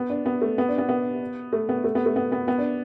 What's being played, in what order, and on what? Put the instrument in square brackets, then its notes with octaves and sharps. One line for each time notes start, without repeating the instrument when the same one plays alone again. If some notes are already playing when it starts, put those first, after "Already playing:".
Already playing: [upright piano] B3
D4
B3
A3
B3
D4
B3
B3
A3
B3
A3
B3
A3
B3
B3
B3
D4